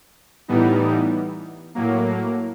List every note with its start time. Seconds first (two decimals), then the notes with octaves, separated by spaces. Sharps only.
0.48 A2 E3 G3 B3 D#4
1.75 A2 F#3 A#3